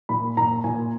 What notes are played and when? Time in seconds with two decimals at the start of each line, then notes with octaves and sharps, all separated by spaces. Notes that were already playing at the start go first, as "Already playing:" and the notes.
0.09 A#2 B5
0.37 A#2 A#5
0.64 A#2 G#5